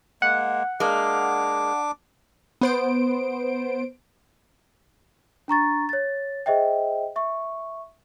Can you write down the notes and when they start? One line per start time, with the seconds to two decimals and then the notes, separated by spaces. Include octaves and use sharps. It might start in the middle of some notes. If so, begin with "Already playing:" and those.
0.22 G#3 A#3 F#5
0.80 G#3 A#3 D4 D6
2.61 B3 C5 D7
5.48 D4 A#5 C#6 A6
5.89 C#5 A6
6.46 G#4 C5 D#5 E5 G5
7.16 E5 C#6